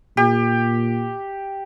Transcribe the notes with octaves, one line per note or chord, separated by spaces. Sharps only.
A#2 G4